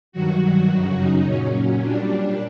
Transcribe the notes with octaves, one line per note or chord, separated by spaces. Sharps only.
G2 D#3 F#3 F#4
F#2 C#3 F#3
D#4
A#2 F#3 C#4
A#2 G3 D4